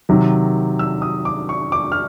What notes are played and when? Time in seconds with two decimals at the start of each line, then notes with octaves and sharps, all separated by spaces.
0.09 C3 D#3 F#3
0.79 E6
1.02 D#6
1.25 D6
1.49 C#6
1.72 D6
1.92 F6